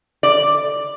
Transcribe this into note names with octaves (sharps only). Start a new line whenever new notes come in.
D5